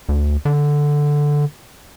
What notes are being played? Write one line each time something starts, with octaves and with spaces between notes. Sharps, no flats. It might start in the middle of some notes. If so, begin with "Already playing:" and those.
D2
D3